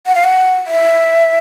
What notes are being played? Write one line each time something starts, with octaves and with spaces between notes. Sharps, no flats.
F#5
F5
F#5
E5